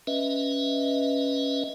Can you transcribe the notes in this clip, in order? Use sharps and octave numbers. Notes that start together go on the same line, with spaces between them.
C#4 B4 D#5 E5